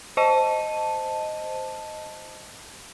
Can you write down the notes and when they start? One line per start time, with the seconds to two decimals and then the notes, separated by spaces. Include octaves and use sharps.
0.17 C5 D#5 A5 D#7